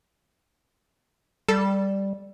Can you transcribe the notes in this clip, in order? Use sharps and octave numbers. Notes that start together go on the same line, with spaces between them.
G3 A4